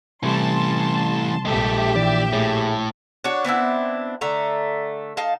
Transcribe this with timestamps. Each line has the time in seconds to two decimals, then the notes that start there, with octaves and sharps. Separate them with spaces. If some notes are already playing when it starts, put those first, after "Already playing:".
0.23 C3 E3 G3 A3 A5 C6
1.45 A#1 G#3 G4 A4 E5
1.96 E3 D5
2.33 A2 A3 G#4
3.24 D4 F#4 C#5
3.44 B3 C4 D4 E4
4.21 D3 A3 A#5
5.17 D#4 F5 A5